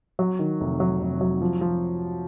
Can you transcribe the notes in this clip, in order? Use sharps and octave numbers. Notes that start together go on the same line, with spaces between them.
F#3
D#3
F1
F#3
F1
F#3
F3
F3